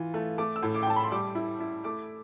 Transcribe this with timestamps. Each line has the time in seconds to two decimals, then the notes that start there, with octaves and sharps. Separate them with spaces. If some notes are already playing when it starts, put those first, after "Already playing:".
Already playing: E3 F4
0.14 A3
0.38 A3 D6
0.56 E6
0.63 A2
0.74 D6
0.83 G5
0.86 A2 A5
0.96 B5
1.04 C6
1.11 G3 D6
1.35 E4
1.60 E4
1.84 A3 D6